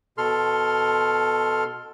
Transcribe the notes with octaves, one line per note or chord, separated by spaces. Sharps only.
B2 A4 C6 F6